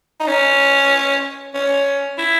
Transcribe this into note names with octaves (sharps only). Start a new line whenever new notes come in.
D#4
C#4
C#4
E4